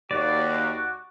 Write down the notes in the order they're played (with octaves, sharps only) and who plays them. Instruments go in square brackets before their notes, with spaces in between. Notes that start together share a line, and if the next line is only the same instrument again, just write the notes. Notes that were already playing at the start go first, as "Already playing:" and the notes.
[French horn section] D#2 [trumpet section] F#4 [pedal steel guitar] D5